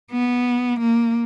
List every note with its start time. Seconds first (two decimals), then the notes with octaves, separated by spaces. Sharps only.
0.12 B3
0.80 A#3